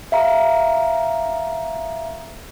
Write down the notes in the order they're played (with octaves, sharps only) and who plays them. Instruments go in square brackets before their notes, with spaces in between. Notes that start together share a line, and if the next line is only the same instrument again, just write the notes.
[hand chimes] E5 F5 A#5